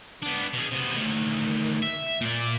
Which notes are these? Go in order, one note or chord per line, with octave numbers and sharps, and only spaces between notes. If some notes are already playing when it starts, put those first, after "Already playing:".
B3 D4
B2 G#4
C3 B3
D2 D#3
E5
A#2 D5